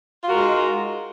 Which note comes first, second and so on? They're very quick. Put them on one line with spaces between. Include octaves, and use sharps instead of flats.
F4 F#4 A#4 G#3 D#4